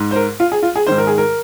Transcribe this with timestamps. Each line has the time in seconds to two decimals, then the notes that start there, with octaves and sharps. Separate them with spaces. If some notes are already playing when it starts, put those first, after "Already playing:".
Already playing: G#2
0.11 C5
0.16 A#4
0.40 F4
0.52 G#4
0.63 F4
0.76 G#4
0.87 G#2 D#3 C5
0.98 A#4
1.07 G#4
1.18 A#4